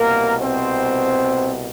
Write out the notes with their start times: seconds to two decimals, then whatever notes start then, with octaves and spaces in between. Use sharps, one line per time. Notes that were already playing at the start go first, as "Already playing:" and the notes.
Already playing: C2 B2 A#3 A#4
0.40 C4 C5